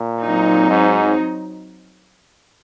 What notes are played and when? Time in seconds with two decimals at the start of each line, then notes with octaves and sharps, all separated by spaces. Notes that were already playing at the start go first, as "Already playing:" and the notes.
Already playing: A#2
0.23 F#3 C4 D#4
0.70 G#2